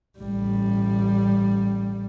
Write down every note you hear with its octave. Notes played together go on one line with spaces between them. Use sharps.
A1 G3